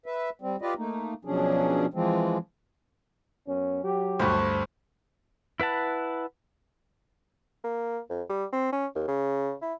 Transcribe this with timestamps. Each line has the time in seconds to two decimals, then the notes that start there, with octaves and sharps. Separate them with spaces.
0.06 B4 E5
0.42 G3 C4
0.62 F4 G4 B4 D5 D#5
0.77 A3 A#3 D#4
1.25 B2 F3 F#3 C#4 D4 G#4
1.94 E3 F3 G#3 C4
3.47 F#2 B3 C#4
3.83 F#3 G4
4.19 D2 G2 C5 B5 C#6
5.60 E4 B4 F#5 A5
7.64 A#3
8.10 F2
8.29 G3
8.53 C4
8.73 C#4
8.95 D#2
9.08 C#3
9.62 E4